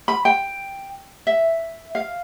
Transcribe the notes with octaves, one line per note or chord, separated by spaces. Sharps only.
B5
G5
E5
F5